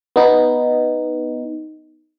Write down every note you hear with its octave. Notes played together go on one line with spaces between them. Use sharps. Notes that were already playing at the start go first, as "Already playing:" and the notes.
B3 D#4